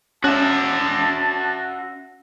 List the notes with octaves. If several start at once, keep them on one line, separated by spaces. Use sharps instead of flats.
C#4 F#4 E5 A5